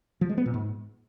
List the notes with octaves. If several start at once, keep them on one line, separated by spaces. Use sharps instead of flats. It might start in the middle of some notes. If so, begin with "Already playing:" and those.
F3
G#3
B3
A#2
G#2